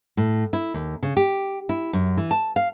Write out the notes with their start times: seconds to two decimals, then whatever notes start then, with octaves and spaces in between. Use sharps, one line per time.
0.17 A2
0.53 E4
0.74 D#2
1.03 C#3
1.17 G4
1.69 E4
1.93 F#2
2.17 E3
2.31 A5
2.56 F5